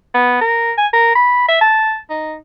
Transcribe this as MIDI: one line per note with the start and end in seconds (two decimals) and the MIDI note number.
0.14 0.39 59
0.41 0.72 70
0.78 0.87 80
0.93 1.12 70
1.16 1.44 83
1.48 1.59 76
1.61 1.98 81
2.10 2.35 63